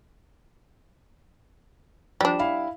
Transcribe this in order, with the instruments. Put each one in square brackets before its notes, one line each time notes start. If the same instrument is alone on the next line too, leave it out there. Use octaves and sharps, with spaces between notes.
[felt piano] F3 [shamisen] G3 D4
[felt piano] E4 F5 B5